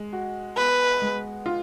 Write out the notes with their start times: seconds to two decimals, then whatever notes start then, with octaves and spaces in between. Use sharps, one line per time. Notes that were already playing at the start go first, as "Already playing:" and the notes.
Already playing: G#3
0.13 F#4
0.57 B3 B4
1.02 G#3
1.46 F4